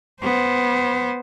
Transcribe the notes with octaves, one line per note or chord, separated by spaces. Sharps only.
B3 C5